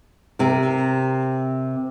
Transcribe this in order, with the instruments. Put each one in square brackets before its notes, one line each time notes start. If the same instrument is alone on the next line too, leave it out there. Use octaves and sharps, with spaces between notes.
[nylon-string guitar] C3 A#4